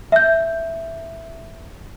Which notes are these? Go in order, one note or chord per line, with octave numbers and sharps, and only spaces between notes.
E5 G6